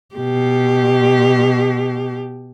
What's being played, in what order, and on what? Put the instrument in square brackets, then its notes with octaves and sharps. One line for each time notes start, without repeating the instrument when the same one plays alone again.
[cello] B2 G4